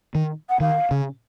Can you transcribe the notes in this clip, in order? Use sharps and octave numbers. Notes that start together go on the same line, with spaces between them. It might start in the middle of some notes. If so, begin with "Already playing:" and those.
D#3
F#5
D#3 F5
C#3